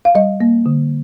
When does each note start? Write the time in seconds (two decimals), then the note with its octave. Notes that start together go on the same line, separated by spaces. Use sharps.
0.05 F5
0.15 G3 D#5
0.41 A#3
0.66 D3